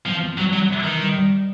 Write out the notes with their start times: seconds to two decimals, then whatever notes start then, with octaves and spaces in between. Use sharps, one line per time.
0.06 F3 C4
0.22 C4
0.37 F#3 G3
0.53 F#3 G3
0.68 C3
0.83 D#3 E3
0.99 G3
1.15 G3